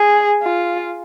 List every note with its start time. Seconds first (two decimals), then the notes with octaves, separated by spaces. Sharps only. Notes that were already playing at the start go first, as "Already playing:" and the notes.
Already playing: G#4
0.43 F4